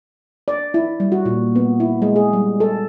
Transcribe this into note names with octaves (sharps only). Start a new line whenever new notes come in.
D5
E4
G3
F#4
A#2
B3
E4
G#3
G#4
G3
A4